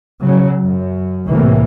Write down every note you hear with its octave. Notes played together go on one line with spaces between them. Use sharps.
C#3 F#3
F#2
C2 A2 C3 E3 A#3